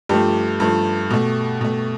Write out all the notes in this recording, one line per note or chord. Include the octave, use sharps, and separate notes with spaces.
G2 F3 A3 G4
G2 F3 A3
B2 A3
B2 A3